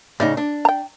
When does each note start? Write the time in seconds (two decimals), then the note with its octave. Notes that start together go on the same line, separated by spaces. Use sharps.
0.20 A2 C#3 D#4 D5
0.37 D4
0.65 G5 A#5